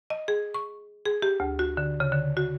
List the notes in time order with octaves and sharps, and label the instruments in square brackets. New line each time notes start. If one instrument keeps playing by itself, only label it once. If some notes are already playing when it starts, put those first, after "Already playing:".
[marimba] D#5
G#4
C#6
G#4
G4
D2
F#4
D3
C#3
D3
F#4